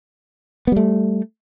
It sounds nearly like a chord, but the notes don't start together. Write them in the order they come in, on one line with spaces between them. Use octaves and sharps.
B3 G3 A3